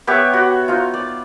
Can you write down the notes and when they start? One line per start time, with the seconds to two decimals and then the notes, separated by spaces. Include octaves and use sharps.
0.07 B3 G4 C#5 E5
0.34 F#4
0.68 D#4 F4
0.94 D5